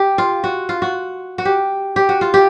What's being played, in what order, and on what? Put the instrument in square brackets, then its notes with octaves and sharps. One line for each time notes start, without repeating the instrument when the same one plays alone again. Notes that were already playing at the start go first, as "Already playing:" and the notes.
Already playing: [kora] G4
F4
F#4
F4
F#4
F#4
G4
G4
F#4
F4
G4